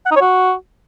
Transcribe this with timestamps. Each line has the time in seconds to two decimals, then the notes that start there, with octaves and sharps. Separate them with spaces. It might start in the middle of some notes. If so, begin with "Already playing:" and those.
0.06 F#5
0.11 D#4
0.16 C#5
0.21 F#4